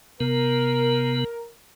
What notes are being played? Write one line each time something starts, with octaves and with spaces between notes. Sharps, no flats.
C3 B3 A#4